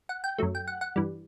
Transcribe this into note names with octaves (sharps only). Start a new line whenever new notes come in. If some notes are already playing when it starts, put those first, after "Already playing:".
F#5
G5
F#2 F#3 A3
G5
F#5
F#5
G2 E3 G3